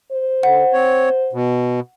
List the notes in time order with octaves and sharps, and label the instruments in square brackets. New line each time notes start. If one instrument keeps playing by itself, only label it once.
[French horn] C5
[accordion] D3 [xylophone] F#5
[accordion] C4 C#5
B2